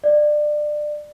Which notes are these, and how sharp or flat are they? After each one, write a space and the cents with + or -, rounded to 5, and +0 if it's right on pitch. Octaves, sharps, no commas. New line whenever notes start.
D5 +25